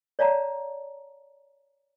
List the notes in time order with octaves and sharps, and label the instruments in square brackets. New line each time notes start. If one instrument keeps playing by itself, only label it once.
[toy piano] C#5 D5 F5 A5 A#5